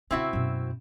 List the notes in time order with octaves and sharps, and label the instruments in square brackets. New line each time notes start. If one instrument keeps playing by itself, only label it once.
[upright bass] C#3 C#4 [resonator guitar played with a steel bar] C4 E4 F#4
[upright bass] F#2 B2